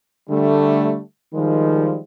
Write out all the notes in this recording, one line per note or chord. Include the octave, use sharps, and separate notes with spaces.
D3 G3 A3
D#3 F3 G3 G#3